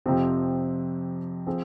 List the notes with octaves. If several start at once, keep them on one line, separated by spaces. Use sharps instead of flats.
F2 C3 F3 C4
F3 C4 G#4